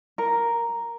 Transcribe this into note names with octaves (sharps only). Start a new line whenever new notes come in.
A#4